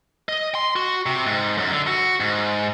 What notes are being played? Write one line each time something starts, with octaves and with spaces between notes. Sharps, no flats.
D#5
C6
F#4
C3
G#2
F#2
D3
F#4
G#2